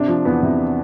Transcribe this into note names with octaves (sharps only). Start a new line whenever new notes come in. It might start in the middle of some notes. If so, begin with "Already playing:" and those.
Already playing: C3 D4
F3
E2 B3
C3